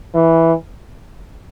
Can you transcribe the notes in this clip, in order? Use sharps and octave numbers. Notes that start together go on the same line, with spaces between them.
E3